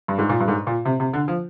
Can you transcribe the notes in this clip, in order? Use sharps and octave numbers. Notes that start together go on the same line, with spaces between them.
G2
G#2
A#2
G2
G#2
A#2
C3
C3
D3
F3